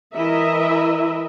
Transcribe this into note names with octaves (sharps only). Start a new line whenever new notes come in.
E3 E4 A#4 D#5 E5